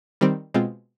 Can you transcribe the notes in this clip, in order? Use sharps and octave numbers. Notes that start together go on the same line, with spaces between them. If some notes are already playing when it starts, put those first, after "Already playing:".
D#3 G3 C4
B2 G#3 C4 F4